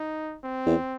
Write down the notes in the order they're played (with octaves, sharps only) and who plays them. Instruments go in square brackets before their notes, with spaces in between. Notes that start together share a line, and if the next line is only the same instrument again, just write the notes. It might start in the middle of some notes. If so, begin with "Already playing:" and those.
Already playing: [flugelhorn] D#4
C4
[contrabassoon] E2